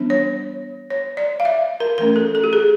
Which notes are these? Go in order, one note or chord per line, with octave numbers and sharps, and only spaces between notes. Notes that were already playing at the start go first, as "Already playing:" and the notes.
Already playing: E3 G3 B3 D4
C#5
C#5
D5
F5
E5
A#4
E3 A3 C#4 A#4
A4
A4
G4
G#4